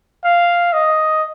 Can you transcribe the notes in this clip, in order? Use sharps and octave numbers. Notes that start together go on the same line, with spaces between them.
F5
D#5